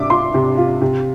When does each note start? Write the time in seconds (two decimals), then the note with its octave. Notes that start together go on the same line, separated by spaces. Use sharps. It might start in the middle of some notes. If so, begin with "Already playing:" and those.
Already playing: C3 D4 E5 D6
0.10 F4 C6
0.34 C3
0.57 F4
0.82 C3